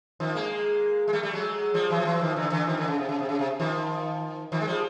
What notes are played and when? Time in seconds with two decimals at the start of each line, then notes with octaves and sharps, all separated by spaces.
0.20 D#3 F3
0.35 G#3 A#3
1.08 G#3
1.13 G3 A3
1.23 G3 A3
1.33 F#3 G#3
1.74 F3 G3
1.90 E3 F#3
2.00 F3
2.05 E3 F#3
2.21 D#3 F3
2.36 D3 E3
2.51 D3 E3
2.67 D#3 F3
2.77 D3 E3
2.88 C#3
2.98 C3
3.09 C#3
3.19 C3
3.29 C#3
3.39 C3
3.60 D#3 F3
4.52 D#3 F3
4.60 G#3
4.67 F3 G3